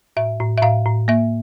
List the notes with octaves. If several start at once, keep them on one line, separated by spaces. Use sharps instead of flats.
A2 E5
A2
E5
A2 F5
A2
A#3 E5